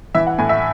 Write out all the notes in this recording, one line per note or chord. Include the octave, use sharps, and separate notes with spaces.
E3 E5
F#5
A2 G#5
E5